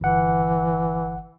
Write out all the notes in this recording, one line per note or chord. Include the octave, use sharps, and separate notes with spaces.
G1 E3 F#5